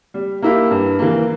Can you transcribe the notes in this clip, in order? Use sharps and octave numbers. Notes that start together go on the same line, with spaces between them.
G3
A#3 E4 G4
G2
E3 A#3